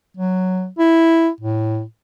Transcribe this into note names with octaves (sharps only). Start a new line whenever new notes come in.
F#3
E4
A2